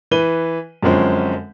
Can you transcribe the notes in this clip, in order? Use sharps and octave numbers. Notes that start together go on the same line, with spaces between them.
E3 B4 D#7 G7
F#2 D3 F3 G#3 C4 C#4